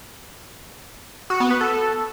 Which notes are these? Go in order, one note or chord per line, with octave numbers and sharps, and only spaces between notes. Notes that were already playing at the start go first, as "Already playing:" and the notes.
F#4
B3
B4
A4